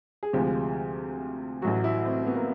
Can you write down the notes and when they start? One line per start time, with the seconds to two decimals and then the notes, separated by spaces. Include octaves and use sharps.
0.23 G#4
0.33 D2 C3 F3 G#3 G4
1.62 A1 A2 F#3 F#4
1.84 E4
2.05 C4
2.27 B3
2.35 A#3